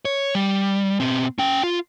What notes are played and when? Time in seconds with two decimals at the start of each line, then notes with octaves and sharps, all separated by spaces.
0.05 C#5
0.35 G3
1.00 B2 C4
1.39 C#4 G5
1.63 F4